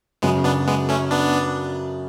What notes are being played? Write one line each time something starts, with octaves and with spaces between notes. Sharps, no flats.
F#2 C#3 F#3 G#3 B3
B3 D4
G#3 B3
A3 C#4
B3 D4